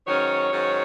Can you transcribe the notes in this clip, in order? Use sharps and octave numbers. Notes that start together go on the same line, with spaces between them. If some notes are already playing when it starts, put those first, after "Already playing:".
G#2 D#3 F#3 C#4 C#5
G#2 D#3 F#3 C#4